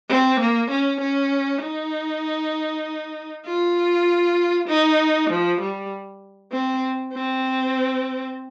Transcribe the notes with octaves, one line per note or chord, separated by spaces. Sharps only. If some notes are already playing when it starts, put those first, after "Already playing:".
C4
A#3
C#4
C#4
D#4
F4
D#4
F3
G3
C4
C4